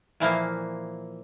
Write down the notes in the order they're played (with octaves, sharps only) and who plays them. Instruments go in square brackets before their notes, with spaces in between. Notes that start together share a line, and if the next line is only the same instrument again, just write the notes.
[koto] A#2 E3 F3 A#3